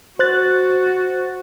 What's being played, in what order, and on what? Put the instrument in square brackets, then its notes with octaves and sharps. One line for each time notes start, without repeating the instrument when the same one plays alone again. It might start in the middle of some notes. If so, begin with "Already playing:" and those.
[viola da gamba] F#4 [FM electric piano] C5 F#6 A6